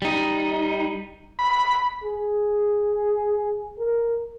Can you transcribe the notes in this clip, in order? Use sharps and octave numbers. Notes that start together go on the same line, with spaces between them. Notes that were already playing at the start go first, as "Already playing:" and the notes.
G3 D#4
B5
G#4
A#4